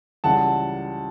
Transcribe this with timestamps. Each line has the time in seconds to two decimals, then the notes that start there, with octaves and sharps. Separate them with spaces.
0.24 C#2 C#3 E3 G3 F#5 A5